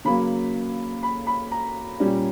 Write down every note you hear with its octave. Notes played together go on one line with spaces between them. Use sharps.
C#3 F#3 A#3 B5
B5
B5
A#5
A#2 G3 C#4